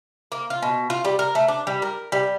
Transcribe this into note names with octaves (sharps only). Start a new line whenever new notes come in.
A#3
F4
B2
F4
G3
A#4
A3
D4
G3
A#4
G3